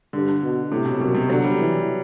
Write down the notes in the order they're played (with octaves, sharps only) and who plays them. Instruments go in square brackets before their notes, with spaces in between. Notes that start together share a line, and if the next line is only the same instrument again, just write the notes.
[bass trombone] G2 [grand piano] D3
[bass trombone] B2
[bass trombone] A2 [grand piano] C3
[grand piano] B2
[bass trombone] F#2 [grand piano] B2
[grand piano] C3
[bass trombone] D3 [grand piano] F#3
[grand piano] G3
[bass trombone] E3